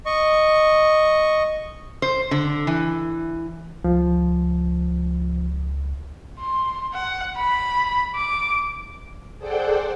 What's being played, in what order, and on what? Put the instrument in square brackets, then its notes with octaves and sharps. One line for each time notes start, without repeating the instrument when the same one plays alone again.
[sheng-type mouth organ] D#5 C#6
[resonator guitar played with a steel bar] C5
D3
E3
[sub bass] C#2 [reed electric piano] F3
[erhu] C6
F#5
B5
D6
[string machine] G#4 A4 C5 D5 F#5 G5